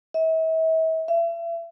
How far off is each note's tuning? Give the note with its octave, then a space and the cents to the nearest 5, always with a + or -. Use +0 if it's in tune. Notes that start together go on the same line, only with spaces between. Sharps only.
E5 -40
E5 +40